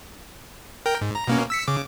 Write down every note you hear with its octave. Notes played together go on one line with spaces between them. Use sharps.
A#4 G5
G#2
A#5
B2 A#3 C#4
E6 B6 C#7
C#3 D6